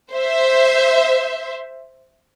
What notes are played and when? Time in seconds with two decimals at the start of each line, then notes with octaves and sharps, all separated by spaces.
0.12 C5 E5